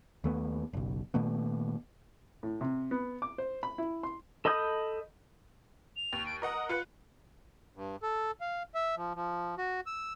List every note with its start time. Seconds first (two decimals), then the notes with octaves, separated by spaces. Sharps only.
0.24 D#2 A3 B3
0.73 F#1 B1
1.14 A#2 D#3 A3 B3
2.43 A2
2.61 C3
2.91 B3
3.22 D6
3.38 C5
3.63 B5
3.78 E4
4.03 C6
4.45 A4 D#5 B5 D#6 G6
5.96 F7
6.13 D#2
6.26 D7
6.42 A#4 D#5 F#5 D#6
6.69 F4 B4 F#6 C#7
7.75 G2
8.03 A4
8.41 F5
8.75 E5
8.96 F3
9.15 F3
9.58 F#4
9.86 E6